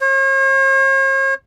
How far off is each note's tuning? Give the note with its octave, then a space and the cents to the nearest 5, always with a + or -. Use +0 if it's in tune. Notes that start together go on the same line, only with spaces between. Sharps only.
C#5 -45